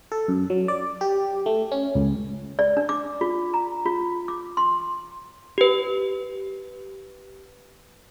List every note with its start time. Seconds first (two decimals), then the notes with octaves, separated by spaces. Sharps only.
0.12 A4
0.28 F#2
0.50 F#3
0.68 D5
1.01 G4
1.46 A3
1.71 C#4
1.95 C#2
2.59 D5
2.77 D4
2.89 D6
3.21 F4
3.54 A#5
3.86 F4
4.28 D6
4.57 C6
5.58 G4 B4